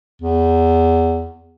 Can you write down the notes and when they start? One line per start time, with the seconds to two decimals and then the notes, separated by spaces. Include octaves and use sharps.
0.22 E2